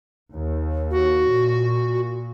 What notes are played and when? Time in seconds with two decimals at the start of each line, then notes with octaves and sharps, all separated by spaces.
0.33 D#2
0.91 F#4
1.28 A#2